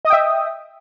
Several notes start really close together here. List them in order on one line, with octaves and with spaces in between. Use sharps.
D#5 D#6 G5 E5